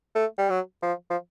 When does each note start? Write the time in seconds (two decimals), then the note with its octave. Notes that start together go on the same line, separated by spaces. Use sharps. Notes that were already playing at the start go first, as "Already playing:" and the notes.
0.15 A3
0.38 G3
0.50 F#3
0.82 F3
1.10 F3